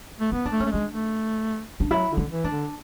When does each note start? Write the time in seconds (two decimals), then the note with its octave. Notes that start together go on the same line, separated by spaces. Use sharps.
0.20 A3
0.32 B3 E4
0.45 D4
0.52 A3
0.60 C#4
0.66 A3
0.71 G#3 D4
0.92 A3
1.80 D4
1.91 F#3 E4
2.11 D3
2.17 E4
2.31 E3
2.44 D4
2.51 D3